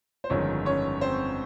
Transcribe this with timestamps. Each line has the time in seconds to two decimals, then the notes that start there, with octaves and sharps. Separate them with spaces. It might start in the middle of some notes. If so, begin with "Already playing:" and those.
0.24 C5
0.30 G1 F2 D#3 G#3 C#4 C#5
0.65 C#4 C#5
1.01 C4 C5